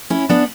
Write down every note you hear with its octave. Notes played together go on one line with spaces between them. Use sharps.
C#4 E4
B3 D4